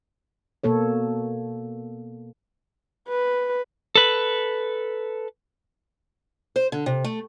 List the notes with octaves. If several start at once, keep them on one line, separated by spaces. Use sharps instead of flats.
B2 A#3 A4 C#5
B4
A4 B4
C5
D3
C3
A3